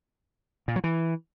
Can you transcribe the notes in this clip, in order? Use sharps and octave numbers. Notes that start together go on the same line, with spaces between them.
A#2
F#3
E3